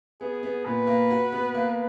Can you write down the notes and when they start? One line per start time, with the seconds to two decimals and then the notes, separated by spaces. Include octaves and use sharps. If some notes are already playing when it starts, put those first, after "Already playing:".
0.21 B3 G#4
0.43 B3
0.65 A#2 B4
0.87 A#3
1.11 F#4
1.32 B3
1.54 A#3